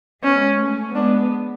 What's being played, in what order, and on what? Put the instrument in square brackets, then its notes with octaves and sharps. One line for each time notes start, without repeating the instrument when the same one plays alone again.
[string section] G#3 B3 [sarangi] C#4
[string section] A3 C#4
[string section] G#3 B3 [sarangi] D4